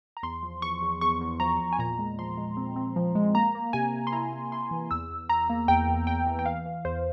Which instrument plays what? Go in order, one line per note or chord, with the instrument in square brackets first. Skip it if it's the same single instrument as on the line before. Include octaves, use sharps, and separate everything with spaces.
[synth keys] A#5
E2 C6
F3
E2 C#6
E2
E2 C#6
E2
F3 A#5
E2
G#5
A#2 A#5
G#3
F3 C6
G#3
C4
C4
F3
G#3
A#3 A#5
A#3
C3 G#5
C3
C6
E4 A#5
E4
E4 C6
E3
E2 E6
E2
E2 A#5
A#3
E2 G5
E2
E2 G5
E3
G5
E3 F5
E3
E2 C5